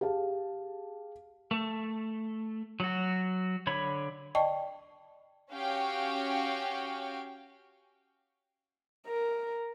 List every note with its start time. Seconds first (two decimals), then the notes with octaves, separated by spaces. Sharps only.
0.01 G4 G#4 F5 A5
1.51 A3
2.80 F#3 F#4
3.67 D3 C#5 B5
4.35 D5 D#5 G5 A5 C#6
5.52 C#4 F#4 G4 F5 G5
9.07 A#4